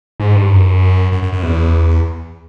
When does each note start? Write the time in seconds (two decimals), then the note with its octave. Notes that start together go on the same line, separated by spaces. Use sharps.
0.20 G#2
0.36 G2
0.50 F#2
1.12 F#2
1.23 F#2
1.33 F#2
1.42 E2